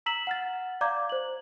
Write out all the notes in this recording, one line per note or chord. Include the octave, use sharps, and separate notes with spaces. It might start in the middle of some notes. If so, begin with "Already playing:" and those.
A#5 E6 B6 E7 F#7
F#5 F6 A6
D5 F5 A#5 D6 G6 G#6
C5 F#7